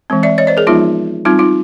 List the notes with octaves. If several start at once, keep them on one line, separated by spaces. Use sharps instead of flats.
E3 G#3 C4
D5 E5
C#5 D#5
C5 D5
G#4 A#4
F3 G#3 B3 D#4 F4
G3 C4 D#4 F4
D#4 F4